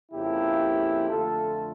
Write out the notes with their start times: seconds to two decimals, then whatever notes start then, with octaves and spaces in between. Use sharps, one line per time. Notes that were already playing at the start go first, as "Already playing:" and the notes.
0.12 F2 C#3 F3 A#3 E4 G4
1.10 F2 D3 A3 F4 A4